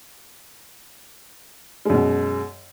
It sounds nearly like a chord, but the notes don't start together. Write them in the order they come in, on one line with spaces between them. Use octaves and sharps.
G#3 F#2 B2